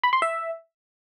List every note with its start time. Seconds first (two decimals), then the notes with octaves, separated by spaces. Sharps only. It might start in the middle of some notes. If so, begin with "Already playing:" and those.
0.04 B5
0.13 C6
0.22 E5